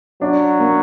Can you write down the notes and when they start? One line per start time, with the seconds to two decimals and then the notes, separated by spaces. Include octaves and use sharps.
0.22 F#3 D4
0.60 A#3